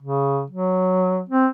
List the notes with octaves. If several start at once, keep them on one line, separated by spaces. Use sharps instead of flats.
C#3
F#3
C4